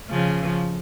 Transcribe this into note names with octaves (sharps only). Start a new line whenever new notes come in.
C#3 F3